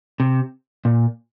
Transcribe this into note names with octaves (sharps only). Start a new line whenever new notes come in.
C3
A#2